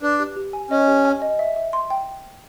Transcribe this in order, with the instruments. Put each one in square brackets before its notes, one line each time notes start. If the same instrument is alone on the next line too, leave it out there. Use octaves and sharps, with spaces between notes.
[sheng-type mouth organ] D4 [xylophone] B4
[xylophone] G4
G4
G#5
[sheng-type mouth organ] C#4 [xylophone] D#5
[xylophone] G4
G#5
D#5
E5
E5
C6
G5